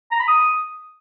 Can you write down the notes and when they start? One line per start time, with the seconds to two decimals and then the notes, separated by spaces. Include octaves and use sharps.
0.11 A#5
0.19 B5
0.27 D#6